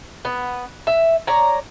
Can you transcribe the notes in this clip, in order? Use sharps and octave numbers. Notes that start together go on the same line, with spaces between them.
B3
E5
C#5 D5 A#5